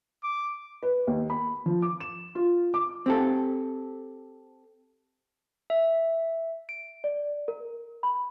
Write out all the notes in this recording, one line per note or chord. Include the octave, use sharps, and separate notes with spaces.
D6
B4
D#2
B5
F3
D6
E7
F4
D6
C4 G4 A4
E5
D7
D5
A#4
B5